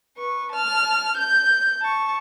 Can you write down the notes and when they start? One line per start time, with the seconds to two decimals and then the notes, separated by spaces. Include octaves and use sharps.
0.17 B4 C#6
0.52 A5 F6
1.17 G6
1.81 A5 C#6